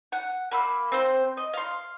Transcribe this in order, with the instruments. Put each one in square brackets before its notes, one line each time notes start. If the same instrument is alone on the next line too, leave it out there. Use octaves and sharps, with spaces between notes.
[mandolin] F#5
A#3 B5 E6
C4 C5
D#5
F5 C6